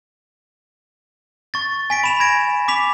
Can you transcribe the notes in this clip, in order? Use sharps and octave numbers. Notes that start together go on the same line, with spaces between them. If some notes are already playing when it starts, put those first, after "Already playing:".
C#6 A6
G#5 B6 D7
B5 E7 F7
G#6 A#6 D7
D6 B6 F7